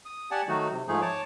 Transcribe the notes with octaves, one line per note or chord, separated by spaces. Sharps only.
D#6
G4 D5 F#5 G#5 A5
D#3 F#3 A3 D#4 F#4
C3
G#2 F3 A3 D#4 G#4
C#5 A5 D6